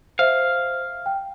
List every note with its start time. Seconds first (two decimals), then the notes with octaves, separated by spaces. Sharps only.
0.19 C5 E5 F5
1.06 G5